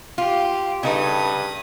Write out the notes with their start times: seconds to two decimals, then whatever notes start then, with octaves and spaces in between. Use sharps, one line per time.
0.18 F4 G4
0.83 G2 C#3 D#4 A4 B4 D#6